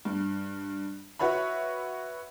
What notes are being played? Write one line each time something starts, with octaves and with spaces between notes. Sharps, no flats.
G2
F#4 B4 C#5 E5 B5